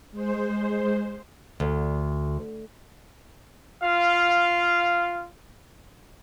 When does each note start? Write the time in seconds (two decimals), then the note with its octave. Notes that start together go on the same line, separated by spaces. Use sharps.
0.11 G#3 C5
1.60 D2
3.83 F4 F5